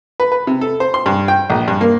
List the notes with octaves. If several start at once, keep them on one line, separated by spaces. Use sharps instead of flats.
B4
B4
C3
A4
C5
C6
G2
G5
A#1
G2
A#3